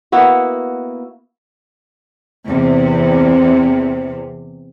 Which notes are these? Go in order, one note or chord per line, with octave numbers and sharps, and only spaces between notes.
A#3 B3 E4 F#4
E2 C3